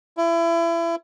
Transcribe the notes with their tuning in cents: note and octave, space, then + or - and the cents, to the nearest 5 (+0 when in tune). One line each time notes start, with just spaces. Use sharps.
E4 +30